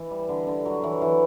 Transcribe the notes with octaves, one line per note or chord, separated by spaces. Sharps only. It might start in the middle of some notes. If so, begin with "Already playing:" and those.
Already playing: E3
G3
D3
D3
F#3
E3
E3